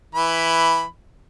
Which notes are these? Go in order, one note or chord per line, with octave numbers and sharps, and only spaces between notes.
E3 B5